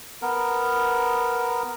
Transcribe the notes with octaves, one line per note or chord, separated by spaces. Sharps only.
B3 A#4